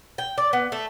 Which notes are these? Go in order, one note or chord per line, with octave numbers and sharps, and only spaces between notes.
G5
D5
B3
A3